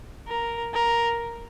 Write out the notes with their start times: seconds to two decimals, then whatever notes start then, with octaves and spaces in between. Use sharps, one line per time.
0.28 A#4
0.74 A#4